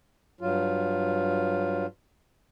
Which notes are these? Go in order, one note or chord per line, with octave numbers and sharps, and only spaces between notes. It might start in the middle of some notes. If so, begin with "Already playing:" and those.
G2 F#3 F4